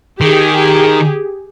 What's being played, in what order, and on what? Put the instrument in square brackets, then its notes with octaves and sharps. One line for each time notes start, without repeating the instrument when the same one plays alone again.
[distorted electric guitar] D#3 [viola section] G4 G#4